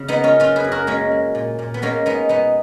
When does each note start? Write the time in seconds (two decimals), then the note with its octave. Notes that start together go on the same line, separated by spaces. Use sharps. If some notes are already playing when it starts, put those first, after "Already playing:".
Already playing: C#3
0.08 B3 D#4
0.17 A#3
0.24 C#4 F4
0.40 F#3 C#4 F4
0.56 G#4 B4
0.64 F#2
0.72 F#4 A#4
0.87 G#3 A#3 C#4
1.11 G#3
1.35 A#2
1.59 A#2
1.74 B3
1.82 G#3 A#3 C#4
2.06 G#3 B3 D#4
2.29 B2 B3 D#4